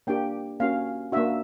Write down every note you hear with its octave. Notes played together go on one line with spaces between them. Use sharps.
A#3 D4 G4 G5
A#3 C#4 F#4 F5
A#3 D4 F#4 E5